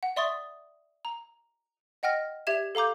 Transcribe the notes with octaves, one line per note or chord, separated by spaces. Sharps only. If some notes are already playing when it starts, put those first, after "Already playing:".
F#5
D5 E5 C6 C#6 D#6 A6
A#5
D#5 F#5 G5 F6 A#6
G4 D5 E5 G#6 E7
A4 F5 A#5 D6 G6